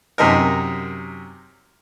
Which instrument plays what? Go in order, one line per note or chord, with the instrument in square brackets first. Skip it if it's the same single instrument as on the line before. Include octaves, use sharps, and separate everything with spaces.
[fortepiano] F#2 C3 D#4 A#4